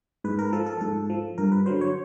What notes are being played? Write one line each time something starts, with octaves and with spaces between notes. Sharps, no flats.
G#2 B4
A#4
F3 A4
A4
G#2 A4
F3
G2 A#4
B4
D3 F#3 C5
C#5